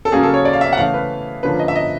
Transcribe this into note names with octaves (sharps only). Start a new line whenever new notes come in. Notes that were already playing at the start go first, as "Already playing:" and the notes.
A4
C#3 F#3 A#3 C#4 G#4
A4
C#5
D5
F5
E5
F#5
C#3 E3 A3 F5
B4
D3 F3 A#3 C#4 B4
D#5
E5
D#5